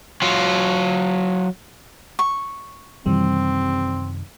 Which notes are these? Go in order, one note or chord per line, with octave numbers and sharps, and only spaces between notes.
F#3 F4
C#6
F#2 C3 D#3 E3 G3 C4